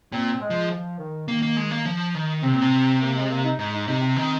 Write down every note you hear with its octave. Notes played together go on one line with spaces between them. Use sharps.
A#2 C4
G#3
F3
F3
D#3
D#3 A#3
A#3
G#3
A#3
F3
D#3
C3 C4
A#2
C3
A#3
G#3
A#3
D#4
G#2 D#4
D#4
C3 D#4
C4
D#3 C4